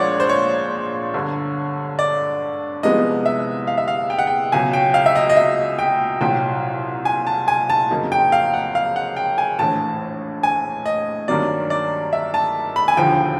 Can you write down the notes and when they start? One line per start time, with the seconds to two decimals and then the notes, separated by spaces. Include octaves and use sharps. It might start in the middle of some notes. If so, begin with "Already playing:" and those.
Already playing: A#1 A#2 F3 G#3 C#5 D5 F#5
0.20 C5
0.29 C#5
1.14 G1 G2 D3
1.99 D5
2.83 C2 C3 F3 G#3 B3 D#5
3.26 E5
3.67 F5
3.78 E5
3.88 F5
4.10 G5
4.19 F#5
4.27 G5
4.52 C#2 B2 F#3 G#5
4.73 G5
4.94 F5
5.06 E5
5.16 D#5
5.29 D#5
5.36 E5
5.79 G5
6.21 C2 A#2 F#3 G5
7.05 G#5
7.27 A5
7.48 G#5
7.70 A5
7.91 F2 C#3 F#3 A#3 D#4
8.12 G5
8.32 F5
8.54 F#5
8.75 F5
8.96 F#5
9.16 G5
9.38 G#5
9.59 A#1 A2 E3 A5
10.43 G#5
10.86 D#5
11.28 G2 D#3 F#3 A#3 D5
11.70 D5
12.13 E5
12.34 A5
12.76 B5
12.88 G#5
12.97 E1 D#2 D3 F3 G5